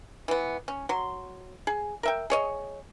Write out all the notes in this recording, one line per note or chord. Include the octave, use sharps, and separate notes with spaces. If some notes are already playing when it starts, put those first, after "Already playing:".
E3 B3
C#4
F#3 C6
G#4
A#4 E5 G5
G#4 C#5 D#5